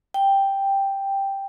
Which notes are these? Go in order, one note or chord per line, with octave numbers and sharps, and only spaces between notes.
G5